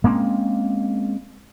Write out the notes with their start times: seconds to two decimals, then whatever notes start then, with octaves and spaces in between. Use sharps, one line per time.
0.04 G#3 A#3 C4 C#4